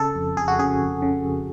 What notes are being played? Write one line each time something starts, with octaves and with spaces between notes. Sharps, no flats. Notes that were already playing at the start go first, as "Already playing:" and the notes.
Already playing: C#3 A4
F2
F2 G#4
F#4
C#3 G#4
F2
C#3
F2